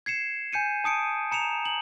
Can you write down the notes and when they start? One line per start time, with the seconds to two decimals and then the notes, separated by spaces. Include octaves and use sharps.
0.06 G#6 C7 C#7 E7
0.53 G#5 G6 C#7 D#7
0.84 A5 D#6 C#7 D7
1.32 A#5 C#7 E7 F7
1.65 F#7